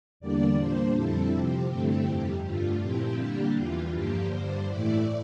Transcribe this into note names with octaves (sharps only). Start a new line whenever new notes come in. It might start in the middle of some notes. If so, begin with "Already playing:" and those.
E2 D3 G3 A#3 D4 D5
A#2 G3 A#3 D4 C5
F2 D3 G3 C4 E4 A4
C3 F3 C4 G4
G2 D3 A3 C4 E4
F2 C3 G3
G2 D3 A3 F4
A#2 F3 C4 E4 G4
D3 G3 A#3 D4
E2 E3 G3 F4
G2 D3 F3 A#3 G4
G2 D3 G3 C5
A2 E3 A3 E4 D5